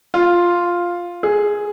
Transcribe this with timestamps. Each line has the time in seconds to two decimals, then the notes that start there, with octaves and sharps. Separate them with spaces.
0.14 F4
1.23 G#4